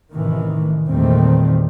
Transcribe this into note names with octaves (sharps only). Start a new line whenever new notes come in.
A1 A2 C3 D#3 E3
E2 A#2 D#3 G3 A3 C4